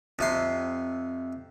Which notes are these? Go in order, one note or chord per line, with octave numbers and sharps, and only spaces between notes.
F2 C3 C6